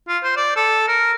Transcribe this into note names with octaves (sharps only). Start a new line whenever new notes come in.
F4
C5
D5
A4
A#4